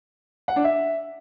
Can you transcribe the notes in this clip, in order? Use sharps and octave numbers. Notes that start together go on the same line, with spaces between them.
F#5
D4
E5